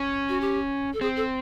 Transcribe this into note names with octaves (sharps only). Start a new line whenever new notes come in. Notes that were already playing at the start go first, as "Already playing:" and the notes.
Already playing: C#4
F#4
G4
A4
C4 G#4
A4